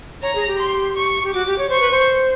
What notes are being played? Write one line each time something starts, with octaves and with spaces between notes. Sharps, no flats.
C#5 A#5
G#4
G4
C6
C#6
G4
F#4 D6
G4
C#5
C5 C#6
B4
C5